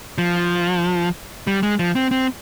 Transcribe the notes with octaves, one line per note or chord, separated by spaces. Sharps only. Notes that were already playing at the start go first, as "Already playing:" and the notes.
F3
G3
G#3
F3
C4
C4